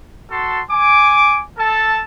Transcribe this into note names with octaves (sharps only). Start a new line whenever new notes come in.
F#4 A4 A5 C6
G#5 D6
A4 A5